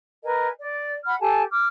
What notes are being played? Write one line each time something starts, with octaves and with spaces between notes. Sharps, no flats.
A#4 B4 D#5 G#5
D5
F#5 B5 F6
G4 A4 G#5 A5
D6 F6